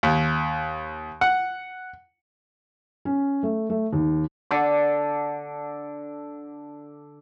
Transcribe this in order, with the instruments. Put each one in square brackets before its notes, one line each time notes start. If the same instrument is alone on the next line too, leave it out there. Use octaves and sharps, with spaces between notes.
[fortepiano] D#2
F#5
[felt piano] C#4
A3
A3
D#2
[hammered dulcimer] D3 D6